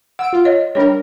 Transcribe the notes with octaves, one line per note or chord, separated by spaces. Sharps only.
F#5 E6 D7
F4
C#5 D#5
G3 D4 A#4 C#5